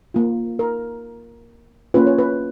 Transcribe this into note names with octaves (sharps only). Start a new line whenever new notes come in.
A#3 F4
A#4
A#3 C#4 F4 B4
C#5
B4